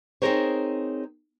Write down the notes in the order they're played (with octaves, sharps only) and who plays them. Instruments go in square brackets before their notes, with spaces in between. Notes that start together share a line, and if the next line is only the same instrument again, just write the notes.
[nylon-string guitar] C4 D#4 G#4 A#4 C5 C#5